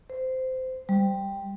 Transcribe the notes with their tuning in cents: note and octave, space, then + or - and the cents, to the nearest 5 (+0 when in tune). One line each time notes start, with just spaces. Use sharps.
C5 -15
G3 +5